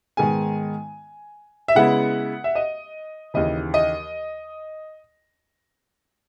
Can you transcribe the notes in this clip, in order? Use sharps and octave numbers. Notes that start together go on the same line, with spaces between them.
G#2 D#3 G#3 B3 G#5
E5
C#3 G#3 B3 E4 F#5
E5
D#5
D#2 C#3 E3 D#5
D#5